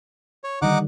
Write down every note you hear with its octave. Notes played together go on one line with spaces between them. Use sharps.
C#5
D3 D#3 G3 D#4 F#5 D6